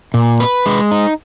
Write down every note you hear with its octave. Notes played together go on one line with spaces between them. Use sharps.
A#2
B4
G#3
D#4